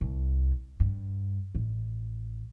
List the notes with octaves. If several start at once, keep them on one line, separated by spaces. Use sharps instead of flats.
C2
G2
A1